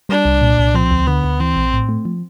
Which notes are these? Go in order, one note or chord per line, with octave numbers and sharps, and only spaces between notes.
G3 D4
C2
A#2
C2
F3 C4
D2
D3 B3
D2
E3 C4
A#1
A2
A3
F3